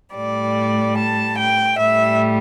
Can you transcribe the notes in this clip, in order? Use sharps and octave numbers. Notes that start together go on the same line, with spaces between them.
A2 G3 D5
A5
G5
A2 G3 E5